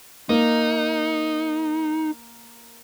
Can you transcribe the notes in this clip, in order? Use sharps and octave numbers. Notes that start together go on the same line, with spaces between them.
A#3 D#4